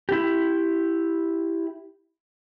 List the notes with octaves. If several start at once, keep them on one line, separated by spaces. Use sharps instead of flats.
E4 G4